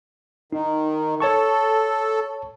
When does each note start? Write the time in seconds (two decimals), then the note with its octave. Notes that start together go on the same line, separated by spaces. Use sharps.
0.53 D#3 D#4
1.20 A4 C#5 A5 C#6